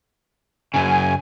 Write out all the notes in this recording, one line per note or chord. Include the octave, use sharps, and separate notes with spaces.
F#2 C#3 G#5